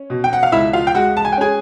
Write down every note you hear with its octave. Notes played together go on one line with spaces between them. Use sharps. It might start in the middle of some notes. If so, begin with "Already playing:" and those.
Already playing: C#4
B2
G5
F#5
F5
C#2 E4 E5
F4 F5
G5
G#3 F#4 F#5
A5
G#5
G5
C#4 G#4 G#5